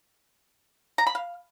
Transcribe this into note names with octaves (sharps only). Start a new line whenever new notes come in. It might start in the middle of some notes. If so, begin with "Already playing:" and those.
A#5
B5
F5